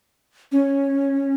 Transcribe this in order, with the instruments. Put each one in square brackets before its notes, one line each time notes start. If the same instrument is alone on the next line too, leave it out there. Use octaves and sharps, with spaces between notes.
[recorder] C#4